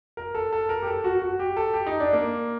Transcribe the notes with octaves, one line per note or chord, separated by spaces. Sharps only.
A#4
A4
A4
A#4
G4
A4
F#4
F#4
G4
A4
G4
D#4
D4
A#3